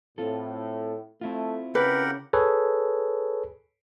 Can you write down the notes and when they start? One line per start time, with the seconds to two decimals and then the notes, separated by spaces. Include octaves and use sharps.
0.18 A2 C4 F4 A4
1.21 A3 C4 E4 F4
1.75 C#3 G4 A#4 B4 F#5
2.33 G#4 A4 B4 C#5